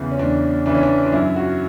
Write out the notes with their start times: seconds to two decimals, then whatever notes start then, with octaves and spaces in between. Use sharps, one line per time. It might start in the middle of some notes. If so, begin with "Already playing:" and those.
Already playing: E2 C#3 E3
0.12 C#4
0.19 E2 D4
0.66 C#3 E3 D4
0.75 C#4
0.83 D4
1.04 D4
1.12 F#2 E4
1.36 F#4